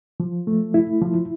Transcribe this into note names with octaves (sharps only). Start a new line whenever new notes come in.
F3
A3
E4
F3